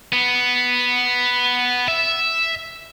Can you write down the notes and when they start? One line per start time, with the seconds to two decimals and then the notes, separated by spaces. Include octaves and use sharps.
0.13 B3
1.88 E5